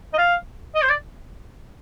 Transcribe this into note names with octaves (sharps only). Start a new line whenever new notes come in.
D#5
F5
D#5
C5
D5